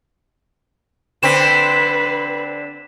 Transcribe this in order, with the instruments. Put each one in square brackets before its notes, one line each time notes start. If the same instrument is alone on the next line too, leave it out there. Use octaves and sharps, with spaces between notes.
[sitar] D3 C4 [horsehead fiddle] B4 [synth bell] B6 E7